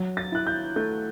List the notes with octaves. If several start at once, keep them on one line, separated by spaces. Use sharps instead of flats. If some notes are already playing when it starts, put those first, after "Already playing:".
Already playing: F#3
A6
E4 F#6
G6
A3 G6